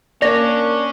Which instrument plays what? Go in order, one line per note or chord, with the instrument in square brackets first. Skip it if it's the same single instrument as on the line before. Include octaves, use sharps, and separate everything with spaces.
[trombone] A#3 [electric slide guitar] C#4 C#5 [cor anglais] D4 [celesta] D5 A#6